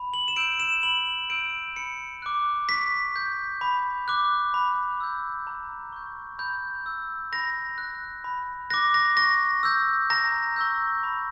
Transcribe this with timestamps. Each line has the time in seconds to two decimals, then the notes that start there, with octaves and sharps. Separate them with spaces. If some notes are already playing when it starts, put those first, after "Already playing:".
Already playing: B5
0.14 F#7
0.28 E7
0.36 E6 G6 D7
0.60 E7
0.83 B5 F#7
1.30 E6 G6 D7
1.76 B5 C#7
2.22 D6 F#6
2.68 C#6 B6
3.16 G6
3.61 B5
4.08 D6 F#6
4.54 B5
5.00 E6 G6
5.47 A#5
5.93 C#6 G6
6.39 B5 G6
6.86 E6 G6
7.32 B5 A#6
7.78 F#6
8.24 B5
8.70 D6 F#6 A#6
8.94 A#6
9.17 C#6 A#6
9.63 E6 G6
10.10 A#5 A#6
10.56 C#6 E6 G6
11.03 B5